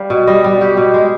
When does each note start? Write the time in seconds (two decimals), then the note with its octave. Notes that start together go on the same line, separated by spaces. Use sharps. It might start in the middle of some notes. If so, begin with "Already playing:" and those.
Already playing: G3 F5
0.10 B2
0.27 G3 D#5
0.44 G3
0.61 B2 G4
0.77 B2
0.94 G#3